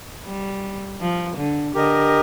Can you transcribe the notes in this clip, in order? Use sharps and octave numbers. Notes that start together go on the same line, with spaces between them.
G3
F3
D3
D3 G4 A#4 D#5